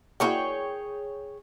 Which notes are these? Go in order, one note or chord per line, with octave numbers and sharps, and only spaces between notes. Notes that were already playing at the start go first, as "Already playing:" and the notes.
A#3 E4 F#4 G#4 C#5 G5